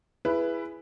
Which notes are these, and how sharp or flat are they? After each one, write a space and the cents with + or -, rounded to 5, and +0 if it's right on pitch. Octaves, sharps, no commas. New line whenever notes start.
E4 +20 G#4 +0 B4 +0